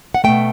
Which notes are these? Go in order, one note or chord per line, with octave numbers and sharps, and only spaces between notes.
F#5
B2 A3 G5